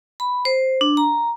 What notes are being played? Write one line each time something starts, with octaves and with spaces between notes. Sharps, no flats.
B5
C5
D4
A#5